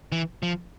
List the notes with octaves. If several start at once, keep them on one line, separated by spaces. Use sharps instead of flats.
E3
F3